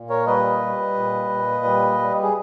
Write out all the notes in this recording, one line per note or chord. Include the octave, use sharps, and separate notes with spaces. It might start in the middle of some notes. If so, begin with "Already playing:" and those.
Already playing: A#2
A#4 C#5
G3 B4 D#5
G3
A#2
A#2
G3
G3
G#4